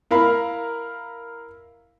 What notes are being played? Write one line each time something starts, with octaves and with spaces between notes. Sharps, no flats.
E4 A#4 F5 B5